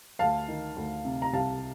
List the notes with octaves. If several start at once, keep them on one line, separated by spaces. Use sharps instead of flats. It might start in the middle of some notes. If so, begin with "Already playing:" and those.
D2 F5 A5
D#3
D2
C3
A#5
C2 F5 A5